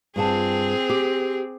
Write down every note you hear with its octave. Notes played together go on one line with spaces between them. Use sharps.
G2 C4 F4 G#4 A5
G4